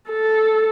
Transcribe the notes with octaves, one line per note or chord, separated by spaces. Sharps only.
A4